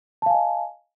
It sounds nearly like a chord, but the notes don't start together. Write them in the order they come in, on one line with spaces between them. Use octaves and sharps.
A5 F5 G#5 D#5